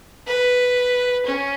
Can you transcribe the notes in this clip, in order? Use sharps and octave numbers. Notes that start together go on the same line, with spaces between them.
B4
C#4